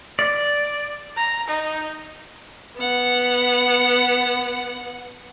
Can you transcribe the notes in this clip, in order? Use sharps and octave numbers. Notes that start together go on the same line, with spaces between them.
D5
A#5
D#4
B3 F#5